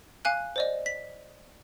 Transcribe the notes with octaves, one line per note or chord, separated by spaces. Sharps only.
F5 G#5 F#6
C5 D5 D#5
B6